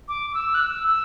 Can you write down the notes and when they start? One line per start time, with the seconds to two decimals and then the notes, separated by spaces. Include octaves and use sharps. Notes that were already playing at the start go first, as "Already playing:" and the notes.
0.08 D6
0.30 D6
0.34 E6
0.54 F#6
0.61 E6
0.88 E6